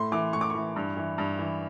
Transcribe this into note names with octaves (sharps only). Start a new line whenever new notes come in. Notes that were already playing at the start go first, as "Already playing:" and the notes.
Already playing: A2 C6
E3 D6
A2 C#6
D6
C#6
E3
G2
E3
G2
E3